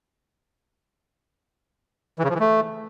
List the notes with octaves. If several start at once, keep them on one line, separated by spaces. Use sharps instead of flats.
E3
C#3
F3
E3
A3